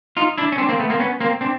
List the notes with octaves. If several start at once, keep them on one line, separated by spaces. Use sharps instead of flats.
D#4 F4
D4 E4
C#4
C4 D4
A#3 C4
A3 B3
A#3 C4
B3 C#4
A#3 C4
C4 D4